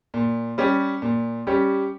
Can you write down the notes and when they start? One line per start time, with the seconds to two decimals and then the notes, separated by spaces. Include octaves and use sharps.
0.14 A#2
0.58 G3 C#4 G4
1.02 A#2
1.47 G3 C#4 G4